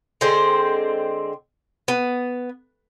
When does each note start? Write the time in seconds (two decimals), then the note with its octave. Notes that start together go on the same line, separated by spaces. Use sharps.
0.21 D3 G#3 C4 C5
1.88 B3